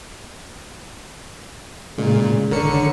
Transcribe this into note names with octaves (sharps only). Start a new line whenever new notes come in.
A#2 C#3 G#3
G#1 D3 A#4 C#5 C#7